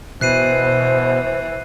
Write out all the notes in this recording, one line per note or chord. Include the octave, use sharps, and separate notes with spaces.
B2 E3 C5 F#6 C7 D#7